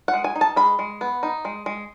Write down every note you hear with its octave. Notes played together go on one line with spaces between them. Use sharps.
F#5
G#3
G#5
D#4
A5
G#3 B5
G#3
B3
D#4
G#3
G#3